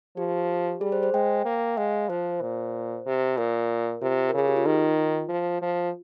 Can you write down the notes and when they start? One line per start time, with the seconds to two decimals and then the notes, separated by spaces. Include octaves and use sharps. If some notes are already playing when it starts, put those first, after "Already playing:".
0.17 F3 G4
0.81 G3 G#4
0.92 C5
1.03 C5
1.13 G#3 G5
1.45 A#3
1.77 G#3 F5
2.09 F3 C5
2.41 A#2
3.06 C3
3.37 A#2 A#4
4.01 C3 F4
4.29 A#4
4.34 C#3 G#4
4.48 G4
4.56 F4
4.66 D#3 D#4
4.97 F4
5.29 F3
5.61 F3